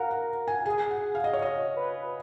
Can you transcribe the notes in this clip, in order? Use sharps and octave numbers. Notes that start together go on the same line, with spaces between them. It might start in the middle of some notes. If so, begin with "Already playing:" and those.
Already playing: A#4 F5 F#5
F#5
G#5
G#4 G#5
F#5
F5
D#5
C#5
D#5
B4